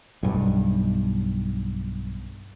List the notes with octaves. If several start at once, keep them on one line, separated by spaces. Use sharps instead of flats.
B1 G2